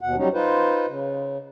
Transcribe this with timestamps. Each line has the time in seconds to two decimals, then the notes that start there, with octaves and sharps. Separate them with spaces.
0.01 D#2 B2 F#5
0.17 F#3 G3 C#4 D#4
0.34 D#4 F4 B4 C5
0.88 C#3